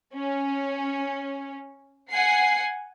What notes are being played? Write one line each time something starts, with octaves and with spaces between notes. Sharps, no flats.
C#4
F#5 G#5 C7